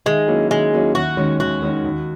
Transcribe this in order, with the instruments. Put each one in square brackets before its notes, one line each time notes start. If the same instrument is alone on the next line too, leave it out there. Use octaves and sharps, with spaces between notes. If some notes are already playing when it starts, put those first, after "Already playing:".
[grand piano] D#3 [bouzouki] G#3
[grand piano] F#3 A#3 C#4 E4
[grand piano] D#3 [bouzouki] G#3
[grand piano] F#3 A#3 C#4 E4
[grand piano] D#2 [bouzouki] F#4
[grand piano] D#3 G#3 C#4
[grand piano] D#2 [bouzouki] F#4
[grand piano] D#3 G#3 C#4
D#2